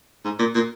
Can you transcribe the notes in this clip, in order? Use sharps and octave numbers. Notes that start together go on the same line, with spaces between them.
G#2
A#2
A#2